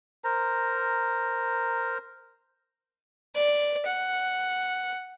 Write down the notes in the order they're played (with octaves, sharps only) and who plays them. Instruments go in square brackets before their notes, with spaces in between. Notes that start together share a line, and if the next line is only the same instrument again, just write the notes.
[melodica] A#4 C5 A#5
[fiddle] D5
F#5